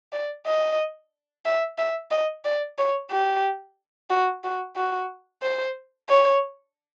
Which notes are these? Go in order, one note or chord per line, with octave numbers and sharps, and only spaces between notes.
D5
D#5
E5
E5
D#5
D5
C#5
G4
F#4
F#4
F#4
C5
C#5